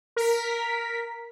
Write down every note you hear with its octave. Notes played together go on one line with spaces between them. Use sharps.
A#4 B6